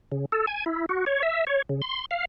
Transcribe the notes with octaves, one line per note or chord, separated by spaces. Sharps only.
C#3
A4
G#5
E4
F#4
C#5
E5
C#5
C#3
C6
F5